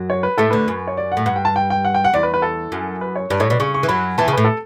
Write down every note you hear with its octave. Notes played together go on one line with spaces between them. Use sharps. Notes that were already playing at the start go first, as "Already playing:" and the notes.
Already playing: F#2 F#3
C#5
B4
A2 A3 A4
D2 D3 B4
F#2
C#5
D5
F#5
A2
G2 F#5
G5
A5
G5
G5
F#5
G5
F#5
E2 D5
B4
B4
A4
F#2
B4
C#5
G2 D5
A2 C#5
B2 D5
C#3 C#6
C#6
E3
F#2 F#3 B5
E2 E3 A5
C#3
A2 B4
A4